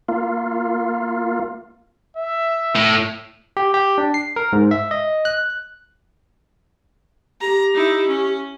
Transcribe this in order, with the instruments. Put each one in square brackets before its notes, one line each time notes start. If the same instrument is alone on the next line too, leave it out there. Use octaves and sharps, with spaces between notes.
[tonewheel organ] A#3 F4
[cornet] E5
[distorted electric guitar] A2
[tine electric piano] G4
G4
D4
C7
A#4
G#2
E5
D#5
F#6
[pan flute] G4 [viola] A#5
[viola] D#4 E4
C#4